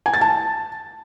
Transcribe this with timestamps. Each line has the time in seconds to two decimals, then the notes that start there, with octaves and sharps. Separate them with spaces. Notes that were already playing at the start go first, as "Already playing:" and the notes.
0.06 G#5
0.14 A6
0.21 A5